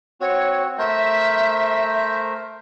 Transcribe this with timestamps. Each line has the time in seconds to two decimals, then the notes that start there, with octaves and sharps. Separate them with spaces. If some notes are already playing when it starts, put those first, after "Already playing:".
0.21 C4 F#4 C#5
0.78 A3 A#4 C5 E5